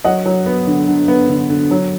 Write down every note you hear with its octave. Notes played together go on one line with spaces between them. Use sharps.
F#3 D#5 F#5
F#3
B3
D3
D3
B3
D3
D3
F#3